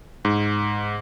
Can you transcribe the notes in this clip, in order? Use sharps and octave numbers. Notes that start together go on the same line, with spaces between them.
G#2